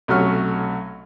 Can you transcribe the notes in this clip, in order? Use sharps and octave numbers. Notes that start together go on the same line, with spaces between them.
B1 C3 F#3 A3 C#4 F6